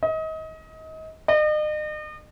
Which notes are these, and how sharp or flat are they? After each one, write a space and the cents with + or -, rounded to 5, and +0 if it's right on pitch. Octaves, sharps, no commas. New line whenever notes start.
D#5 +30
D#5 -40